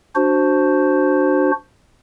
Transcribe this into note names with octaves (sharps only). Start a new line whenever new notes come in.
D4 F#4 C5